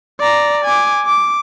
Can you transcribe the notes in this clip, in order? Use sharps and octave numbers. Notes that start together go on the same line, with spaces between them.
D5 A#5
G#5 D6
D6